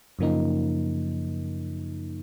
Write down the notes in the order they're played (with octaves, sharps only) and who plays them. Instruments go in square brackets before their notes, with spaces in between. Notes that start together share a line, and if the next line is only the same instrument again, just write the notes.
[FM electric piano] F#2 C#3 F3 A#3 D#4